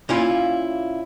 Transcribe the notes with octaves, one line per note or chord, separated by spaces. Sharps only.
A#2 C#4 E4 F4